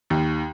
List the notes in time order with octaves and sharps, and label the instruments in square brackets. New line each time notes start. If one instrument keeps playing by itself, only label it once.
[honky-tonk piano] D#2